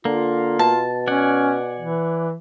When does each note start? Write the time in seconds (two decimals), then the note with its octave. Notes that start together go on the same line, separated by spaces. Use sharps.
0.05 D3 A#3 F4
0.59 B2 A5
1.08 C#4 D5 F#5 G#5
1.80 E3